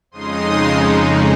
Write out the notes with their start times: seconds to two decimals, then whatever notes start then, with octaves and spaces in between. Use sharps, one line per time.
0.11 F2 C#3 G#3 D#4 C6 D#6